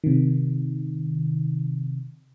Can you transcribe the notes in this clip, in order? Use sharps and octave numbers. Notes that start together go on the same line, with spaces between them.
C3 D#3